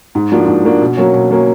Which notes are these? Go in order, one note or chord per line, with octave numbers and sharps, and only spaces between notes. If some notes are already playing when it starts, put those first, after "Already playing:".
G#2
F3 A#3 D4 F#4
G#2
F3 A#3 D4 F#4
B2
F#3 A#3 C#4
B2
F#3 A#3 C#4